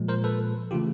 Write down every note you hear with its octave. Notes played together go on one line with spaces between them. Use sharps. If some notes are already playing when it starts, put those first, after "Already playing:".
Already playing: A#2 F3 G#3
A#4 C5
A4 B4
C#3 E3 A3 F4 G4